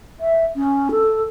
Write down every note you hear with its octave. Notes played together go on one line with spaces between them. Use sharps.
E5
C#4
A4